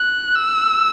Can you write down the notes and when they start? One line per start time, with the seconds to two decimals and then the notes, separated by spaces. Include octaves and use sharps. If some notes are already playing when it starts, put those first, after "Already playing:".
Already playing: F#6
0.36 E6